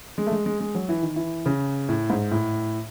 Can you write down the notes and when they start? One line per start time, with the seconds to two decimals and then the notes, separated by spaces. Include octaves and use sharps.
0.18 G#3
0.27 A3
0.32 G#3
0.46 G#3
0.60 G#3
0.75 F#3
0.89 E3
1.03 D#3
1.16 E3
1.46 C#3
1.89 A2
2.10 G#2
2.31 A2